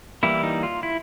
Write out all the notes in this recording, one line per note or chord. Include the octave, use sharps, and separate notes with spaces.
E3 G3 A#3 E4
D#4
F4
E4